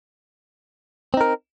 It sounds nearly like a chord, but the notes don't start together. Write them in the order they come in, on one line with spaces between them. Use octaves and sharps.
C4 D#4 A#4